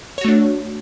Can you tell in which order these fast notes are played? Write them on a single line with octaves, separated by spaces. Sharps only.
C#5 F#4 A3 D4